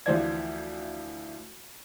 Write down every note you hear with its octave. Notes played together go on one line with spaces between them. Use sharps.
D2 E3 F3 C5 D5 G#6